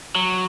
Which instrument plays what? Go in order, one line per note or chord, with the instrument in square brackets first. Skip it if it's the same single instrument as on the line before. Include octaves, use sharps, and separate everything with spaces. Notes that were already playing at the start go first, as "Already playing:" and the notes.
[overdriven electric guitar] F#3